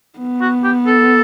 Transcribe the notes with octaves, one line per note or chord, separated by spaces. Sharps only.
B3
F#4
G4
A4